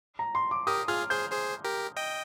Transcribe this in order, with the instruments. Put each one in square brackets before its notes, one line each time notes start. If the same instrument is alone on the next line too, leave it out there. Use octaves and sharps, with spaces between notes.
[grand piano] A#5
C6
D6
[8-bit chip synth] G4 A#4 [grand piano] D#6
[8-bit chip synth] F4 G#4 [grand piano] F6
[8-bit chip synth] G#4 C5 [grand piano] G6
[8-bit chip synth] G#4 C5
G4 A#4
D#5 G5